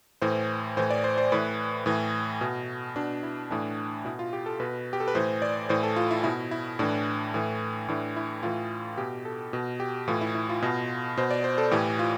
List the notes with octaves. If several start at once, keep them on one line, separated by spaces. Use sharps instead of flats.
A2 E3 C5
A2 E3 C5
D5
C5
C5
A2 E3 B4
A2 E3
B2
B2 D4
E4
A2 E3 D4
B2 E4
F4
G4
A4
B2 B4
G4
A4
B4
A2 E3 C5
D5
A2 E3 C5
A4
F4
E4
B2 E4
E4
A2 E3 D4
A2 E3
A2 E3 D4
E4
A2 E3 F4
B2 G4
A4
B2
G4
A2 E3 F4
E4
E4
F4
B2
B2 C5
D5
C5
A4
A2 E3 G4
F4